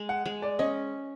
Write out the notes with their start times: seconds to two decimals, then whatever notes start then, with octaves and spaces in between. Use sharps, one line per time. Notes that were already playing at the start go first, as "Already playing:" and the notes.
Already playing: G#3
0.09 F#5
0.26 G#3
0.42 D5
0.59 C#4 D#5